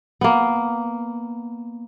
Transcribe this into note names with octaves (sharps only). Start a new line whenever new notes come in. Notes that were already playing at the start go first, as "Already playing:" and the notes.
A#3 B3